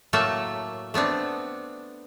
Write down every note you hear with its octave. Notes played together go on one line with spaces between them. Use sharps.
A2 F#3 A3 A#3 E5 A5
A3 B3 C4 D4